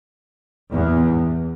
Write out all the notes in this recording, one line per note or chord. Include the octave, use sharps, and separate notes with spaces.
E2